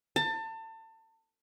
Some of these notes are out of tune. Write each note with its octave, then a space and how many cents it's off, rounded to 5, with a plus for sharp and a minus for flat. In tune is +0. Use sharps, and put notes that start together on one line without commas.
A5 +30